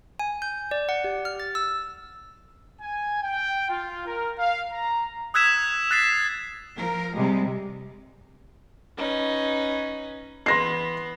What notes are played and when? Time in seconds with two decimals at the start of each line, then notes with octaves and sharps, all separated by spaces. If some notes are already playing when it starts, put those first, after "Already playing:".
0.19 G#5
0.42 G6
0.71 D5
0.89 F#5
1.04 G4
1.25 F6
1.40 A6
1.55 E6
2.80 G#5
3.22 G5
3.69 F4
4.07 A#4
4.38 F5
4.72 A#5
5.34 D#6 E6 F#6 G#6 B6 E7
5.91 F#6 A6 B6 C7 E7
6.76 F3 A#4
7.15 C3 G3 G#3
8.96 C#4 D#4 B4
10.46 E3 B3 C6 A#6 C7